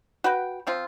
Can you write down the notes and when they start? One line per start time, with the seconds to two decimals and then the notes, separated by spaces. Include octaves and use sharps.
0.24 F#4 B4 G5
0.67 F3 C4 F4